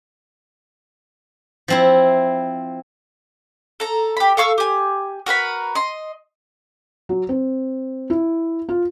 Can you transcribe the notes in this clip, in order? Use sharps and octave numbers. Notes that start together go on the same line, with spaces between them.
F3 C4 E4
A4 A#5
G4 B5
A4 F5 C#6 E6
G4 G#5
F#4 A#4 B4 B5
D#5 C6
F#3
C4
E4
F4